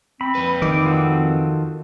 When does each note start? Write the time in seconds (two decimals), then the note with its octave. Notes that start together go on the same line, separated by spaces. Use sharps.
0.21 C4 B5
0.35 F2 B4
0.62 D#3 D6
0.86 F4 F#4 A4